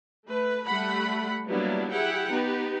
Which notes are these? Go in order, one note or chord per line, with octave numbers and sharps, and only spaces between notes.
A3 B4
G3 A3 F#5 B5
F#3 G3 A#3 B3 D4 E4
E4 G4 G#4 F#5 G5
B3 D#4 G4 B4